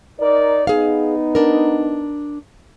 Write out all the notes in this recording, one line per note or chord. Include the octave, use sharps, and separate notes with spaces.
D#4 A#4 D5
B3 D#4 G#4 F5
D4 A#4